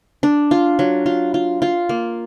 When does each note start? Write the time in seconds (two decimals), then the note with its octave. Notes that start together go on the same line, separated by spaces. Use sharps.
0.23 D4
0.51 F4
0.79 F#3
1.06 F4
1.34 F4
1.62 F4
1.89 A#3